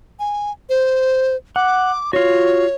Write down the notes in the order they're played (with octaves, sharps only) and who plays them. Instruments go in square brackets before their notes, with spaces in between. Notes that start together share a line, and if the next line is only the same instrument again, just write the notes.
[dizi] G#5
C5
[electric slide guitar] F#5 [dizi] D6
[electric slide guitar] F4 F#4 [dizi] C#5